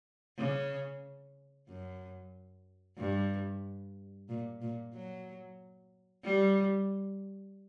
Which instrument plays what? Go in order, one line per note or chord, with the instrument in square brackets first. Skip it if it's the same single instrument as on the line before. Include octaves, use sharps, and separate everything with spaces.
[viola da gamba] C#3
F#2
G2
A#2
A#2
F#3
G3